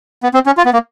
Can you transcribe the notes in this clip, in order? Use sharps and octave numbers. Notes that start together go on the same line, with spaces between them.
B3
C4
C#4
F4
B3
A#3